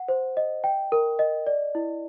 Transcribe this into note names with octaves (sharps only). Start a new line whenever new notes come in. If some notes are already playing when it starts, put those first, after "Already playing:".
Already playing: F#5
C5
D#5
G5
A#4
D#5
D5
E4